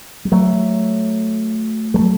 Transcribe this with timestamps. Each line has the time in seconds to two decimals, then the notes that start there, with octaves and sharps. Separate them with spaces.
0.25 G3
0.32 F#3 A3
1.94 G3
1.99 F#3 A3